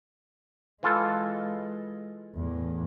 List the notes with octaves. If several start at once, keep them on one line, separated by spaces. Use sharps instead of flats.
E3 G#3 F4 A4
E2 A2